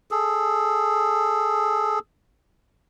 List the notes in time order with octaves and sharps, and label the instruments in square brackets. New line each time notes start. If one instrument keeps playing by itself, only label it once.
[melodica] G#4 A4